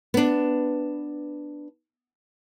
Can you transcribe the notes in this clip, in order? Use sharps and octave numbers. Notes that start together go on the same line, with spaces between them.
B3 D4